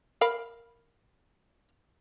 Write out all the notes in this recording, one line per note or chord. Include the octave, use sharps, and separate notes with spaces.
A#4 F5 B5